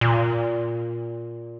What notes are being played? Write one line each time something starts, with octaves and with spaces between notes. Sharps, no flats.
A#2